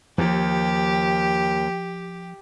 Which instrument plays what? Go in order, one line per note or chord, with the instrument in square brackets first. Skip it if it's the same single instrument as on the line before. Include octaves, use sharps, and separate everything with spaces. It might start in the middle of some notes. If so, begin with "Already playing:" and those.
[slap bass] D#2 [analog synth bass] F3 [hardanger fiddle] G4